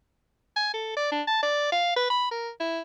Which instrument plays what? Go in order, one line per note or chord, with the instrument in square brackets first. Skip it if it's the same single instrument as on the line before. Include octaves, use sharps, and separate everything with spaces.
[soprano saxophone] G#5
A4
D5
D4
A5
D5
F5
B4
B5
A#4
E4